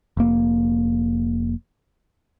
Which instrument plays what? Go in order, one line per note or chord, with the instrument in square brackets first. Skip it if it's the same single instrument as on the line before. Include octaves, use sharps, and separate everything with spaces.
[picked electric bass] F1 A#3